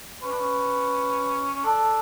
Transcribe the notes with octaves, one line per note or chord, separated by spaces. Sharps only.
C#4 B4
D4
C#4
C#4
D4 A4